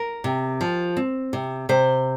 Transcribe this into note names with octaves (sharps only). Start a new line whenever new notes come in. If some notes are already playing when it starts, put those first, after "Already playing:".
Already playing: A#4
C3
F3
C4
C3
C3 C5